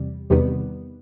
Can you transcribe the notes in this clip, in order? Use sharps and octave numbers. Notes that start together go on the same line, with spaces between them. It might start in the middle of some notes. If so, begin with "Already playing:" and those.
Already playing: E2 C3 G3
E2 C3 D#3 G3 B3